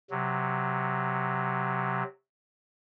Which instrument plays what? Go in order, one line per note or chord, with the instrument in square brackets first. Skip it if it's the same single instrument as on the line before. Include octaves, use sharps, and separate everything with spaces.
[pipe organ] C3 F#3